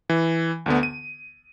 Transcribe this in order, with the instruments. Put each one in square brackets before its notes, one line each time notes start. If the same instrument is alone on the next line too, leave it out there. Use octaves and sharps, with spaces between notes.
[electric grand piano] E3
D2 D3 B3
D#7